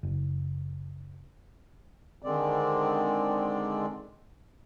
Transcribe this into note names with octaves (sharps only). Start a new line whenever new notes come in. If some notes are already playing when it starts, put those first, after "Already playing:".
F#1
D3 D#3 G#3 C4 D5